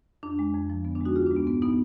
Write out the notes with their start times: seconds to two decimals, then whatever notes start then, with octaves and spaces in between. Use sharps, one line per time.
0.23 F2 D4
0.39 G#3
0.54 F2
0.70 F3
0.85 D3 B3
0.95 D4
1.01 G#3 D#4 F#4
1.16 D2 F4 G#4
1.26 D4
1.31 G#3
1.36 B3
1.47 G#2 B3
1.62 B3 D#4